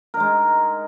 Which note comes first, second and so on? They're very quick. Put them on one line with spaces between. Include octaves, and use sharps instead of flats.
A#4 D#4 G#3